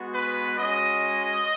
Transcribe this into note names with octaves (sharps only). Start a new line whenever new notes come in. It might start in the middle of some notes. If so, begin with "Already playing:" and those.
Already playing: G#3 B3 F#4
B4
G#3 C#4 F#4 D#5